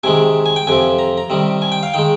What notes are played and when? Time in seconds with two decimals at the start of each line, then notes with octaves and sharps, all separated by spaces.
0.04 C3 D#3 G#3 G#5
0.46 G#5
0.56 G5
0.67 F2 C3 F3 G#5
0.99 A#5
1.18 A#5
1.30 C3 D#3 G3
1.62 G#5
1.72 G5
1.83 F5
1.94 D#3 G#3 G5